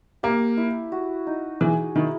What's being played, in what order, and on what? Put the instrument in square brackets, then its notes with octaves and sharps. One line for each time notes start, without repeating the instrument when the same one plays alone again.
[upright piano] A#3 [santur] G4
[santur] E4
F#4
D#4
[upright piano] E3 [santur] G#4
[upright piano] D#3 [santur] E4